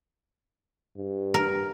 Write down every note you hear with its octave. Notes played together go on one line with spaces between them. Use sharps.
G2
A#4